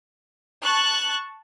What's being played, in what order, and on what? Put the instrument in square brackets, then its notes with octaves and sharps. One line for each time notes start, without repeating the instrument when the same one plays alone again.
[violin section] A5 C#6 F#6